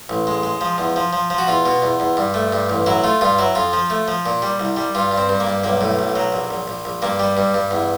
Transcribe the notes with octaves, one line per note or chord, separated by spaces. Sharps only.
A1
G#3
G#3
F3
E2
F3
F3
F3
F#4
E2 F4
B2
E2
E2
G2
A3
G2
A1
F#3 E4
A3 F4
G2 F4
F#3 E4
F2 F4
F3
A3
F3
A#2
G3
C2
G3
G2 F4
G2
C4
G2
A#3
G2
B1 A#3
A2
B1
F#3
A#1
A#1
A#1
A#1
G2 A#3
G3
G2
G2
E2